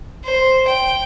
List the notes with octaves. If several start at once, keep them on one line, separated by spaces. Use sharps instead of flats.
C5
G5